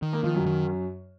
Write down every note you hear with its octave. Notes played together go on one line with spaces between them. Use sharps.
D#3
A#3 A#4
D#3 F3 F4
F#2 F#3
D#3